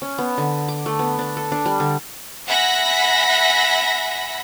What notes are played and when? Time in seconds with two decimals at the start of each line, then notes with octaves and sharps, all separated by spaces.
0.02 C#4
0.18 B3
0.38 D3
0.68 D6
0.86 A3
0.99 B3
1.19 D4
1.37 A4
1.52 D4
1.66 G3
1.80 D3
2.47 E5 F#5 G#5 B5 A#6 B6